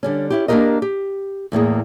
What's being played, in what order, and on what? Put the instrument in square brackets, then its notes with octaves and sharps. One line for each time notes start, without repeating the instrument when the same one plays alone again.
[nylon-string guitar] D3 G3 C#4
C#4 E4 G4
A#3 D4 E4 G4 A#4 D#5
G4
E2 A2 A#3 G#4